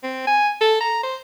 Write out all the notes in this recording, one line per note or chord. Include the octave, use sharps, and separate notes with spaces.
C4
G#5
A4
A#5
C5